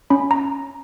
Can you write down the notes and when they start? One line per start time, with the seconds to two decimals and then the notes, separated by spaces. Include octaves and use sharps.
0.10 C#4 B5
0.31 A#5